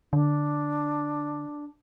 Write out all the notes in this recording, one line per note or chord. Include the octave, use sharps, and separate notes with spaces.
D3 D4